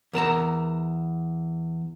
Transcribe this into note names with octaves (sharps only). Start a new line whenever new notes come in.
E2 A#4 A5 A#5